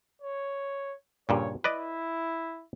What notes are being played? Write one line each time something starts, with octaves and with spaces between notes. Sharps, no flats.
C#5
G2 A#2 C#3 C#5
E4 B4 D5 D#5